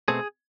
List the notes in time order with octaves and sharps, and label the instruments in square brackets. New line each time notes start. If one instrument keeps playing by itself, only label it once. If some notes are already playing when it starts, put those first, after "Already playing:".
[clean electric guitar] B2 A3 C4 G#4